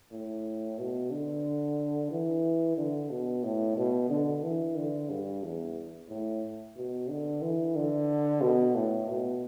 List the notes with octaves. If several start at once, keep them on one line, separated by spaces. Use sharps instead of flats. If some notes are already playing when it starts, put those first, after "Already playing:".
A2
B2
D3
E3
D3
B2
A2
B2
D3
E3
D3
G2
E2
A2
B2
D3
E3
D3
B2
A2
B2